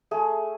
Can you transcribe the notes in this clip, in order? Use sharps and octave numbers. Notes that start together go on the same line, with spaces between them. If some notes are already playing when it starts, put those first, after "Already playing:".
A3 G#4